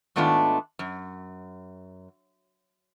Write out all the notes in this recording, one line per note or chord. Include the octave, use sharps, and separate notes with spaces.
G#2 D#3 A3 B3 D4 F4
F#2